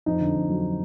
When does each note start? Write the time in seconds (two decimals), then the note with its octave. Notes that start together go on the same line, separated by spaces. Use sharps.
0.06 F2 D#4
0.21 D3
0.35 F2
0.50 F#3